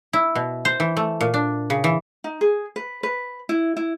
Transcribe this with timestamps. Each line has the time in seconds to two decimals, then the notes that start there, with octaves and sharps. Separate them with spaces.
0.13 E4
0.35 B2
0.65 C5
0.80 E3
0.97 A3
1.21 A#2
1.34 D4
1.70 C#3
1.84 E3
2.24 D#4
2.41 G#4
2.76 B4
3.03 B4
3.49 E4
3.77 E4